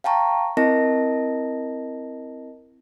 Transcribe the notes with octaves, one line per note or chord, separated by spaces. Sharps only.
F5 G5 A5 A#5 C#6
C4 E4 A#4 D#5 A5 A#6